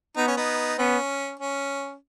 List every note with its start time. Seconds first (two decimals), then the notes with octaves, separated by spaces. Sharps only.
0.17 B3 D#4
0.28 C#4
0.37 B3 D#4
0.78 B3 C#4
1.39 C#4